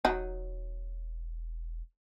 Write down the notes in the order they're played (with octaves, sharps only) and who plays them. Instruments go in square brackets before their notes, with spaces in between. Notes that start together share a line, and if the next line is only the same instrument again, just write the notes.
[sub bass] E1 [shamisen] F#3 D#4